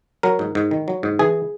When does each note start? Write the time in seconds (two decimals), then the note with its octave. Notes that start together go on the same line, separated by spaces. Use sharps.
0.23 F#3 A#4
0.39 G#2
0.55 G#2
0.71 D#3
0.88 F#3
1.03 G#2
1.19 E3 G#4